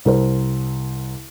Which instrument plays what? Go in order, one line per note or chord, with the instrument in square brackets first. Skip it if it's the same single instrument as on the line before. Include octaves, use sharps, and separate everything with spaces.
[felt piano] C2 A#4 C5